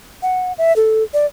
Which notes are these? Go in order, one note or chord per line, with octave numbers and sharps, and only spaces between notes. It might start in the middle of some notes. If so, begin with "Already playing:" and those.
F#5
E5
A4
D5